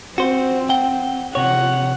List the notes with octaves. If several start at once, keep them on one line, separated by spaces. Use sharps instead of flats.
C4 F#4 C5
F#5 G5
C3 C#5 F#5